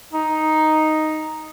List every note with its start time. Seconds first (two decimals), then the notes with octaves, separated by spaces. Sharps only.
0.13 D#4